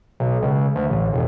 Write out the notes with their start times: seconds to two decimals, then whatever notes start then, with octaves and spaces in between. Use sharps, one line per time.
0.20 B1
0.42 C#2
0.76 D2
0.90 A1
1.13 E1